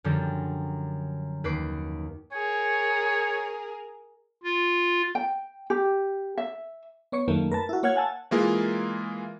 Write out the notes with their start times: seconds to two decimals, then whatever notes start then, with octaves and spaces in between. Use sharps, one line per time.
0.04 F#2 D3 F3 G3
1.44 D#2 B4 D6 C7
2.32 G#4 A#4 C#5
4.43 F4
5.15 G5
5.70 G4
6.38 E5
7.12 B3 C#5 C#6 C#7
7.28 F#2 D#3 A3 A#3
7.51 A#4 B4 A5
7.69 E4 F#4
7.83 A#3 C#5 F#5 F6 G#6
7.95 F5 F#5 G#5 A5 E6
8.31 E3 G#3 A#3 F4 G#4 A#4